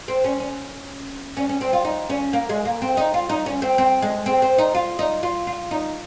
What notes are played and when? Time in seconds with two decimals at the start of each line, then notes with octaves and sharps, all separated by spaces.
0.08 C4
0.24 C#4
0.40 C#4
1.37 C#4
1.49 C#4
1.61 C4
1.73 F4
1.85 D#4
2.10 C#4
2.33 A#3
2.49 G#3
2.65 A#3
2.82 C4
2.97 D#4
3.14 F4
3.29 D#4
3.46 C#4
3.62 C4
3.78 C4
4.02 G#3
4.26 C4
4.42 C4
4.58 D#4
4.75 F4
4.99 D#4
5.23 F4
5.47 F4
5.71 D#4